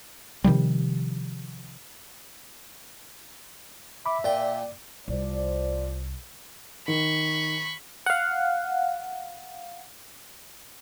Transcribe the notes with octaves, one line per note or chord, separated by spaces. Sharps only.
C3 D#3 F3 G3
E5 B5 D6
A#2 D5 G5
C2 F3 C5 D5
D#3 B5 C#6
F5 F#5